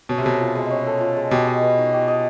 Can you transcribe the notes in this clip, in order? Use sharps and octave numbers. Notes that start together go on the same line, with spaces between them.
B2 C#4
C3
B2 A4
F4
G#3
C#4
A4
F4
G#3
B2 G4
D#5
B4
D#4
G4
D#5